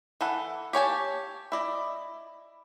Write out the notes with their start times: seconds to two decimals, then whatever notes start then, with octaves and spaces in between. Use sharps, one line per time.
0.21 E3 A4 F#5
0.73 G4 C#5 G#5 A5
1.52 E4 D5 D#5